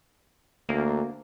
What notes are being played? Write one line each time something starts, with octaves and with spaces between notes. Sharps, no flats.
D2 A#3